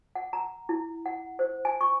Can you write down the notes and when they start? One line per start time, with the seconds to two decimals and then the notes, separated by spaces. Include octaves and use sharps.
0.15 F#5
0.33 A#5
0.69 E4
1.06 F#5
1.39 C5
1.65 G#5
1.81 C#6